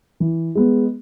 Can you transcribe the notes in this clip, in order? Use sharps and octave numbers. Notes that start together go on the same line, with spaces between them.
E3
G#3 B3